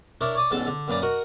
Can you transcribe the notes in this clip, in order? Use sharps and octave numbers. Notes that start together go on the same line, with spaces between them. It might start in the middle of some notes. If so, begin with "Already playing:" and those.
D4 E4 A#4 C#5
C#5 D5 D#6
A1 E2 G#2 A4 A5
D3
F#2 A#2 B4 D5 A#5
F#4 A#4 D#5 F#5